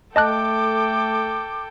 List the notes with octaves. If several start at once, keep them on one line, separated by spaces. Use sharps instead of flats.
A3 A4 D#5 G5 A5 D6 F#6